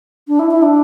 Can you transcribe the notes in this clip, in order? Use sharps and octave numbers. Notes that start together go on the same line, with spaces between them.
D4
E4
E4
D4